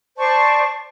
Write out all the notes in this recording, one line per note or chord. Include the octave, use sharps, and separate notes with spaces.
C5 D5 A5 C#6